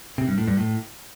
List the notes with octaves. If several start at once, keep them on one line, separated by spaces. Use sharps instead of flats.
C3
G2
A2
G2
A2